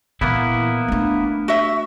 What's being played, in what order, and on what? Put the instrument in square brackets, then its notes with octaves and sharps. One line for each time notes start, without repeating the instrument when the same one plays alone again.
[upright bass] A#2 E3 [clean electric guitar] A#3 B3 E4
[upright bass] A3 D4
[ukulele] F#4 E5